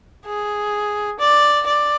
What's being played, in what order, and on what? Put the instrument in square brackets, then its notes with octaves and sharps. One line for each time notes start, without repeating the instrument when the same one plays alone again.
[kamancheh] G#4
D5
D5